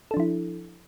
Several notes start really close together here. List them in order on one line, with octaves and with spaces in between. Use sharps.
A4 D4 F3 E4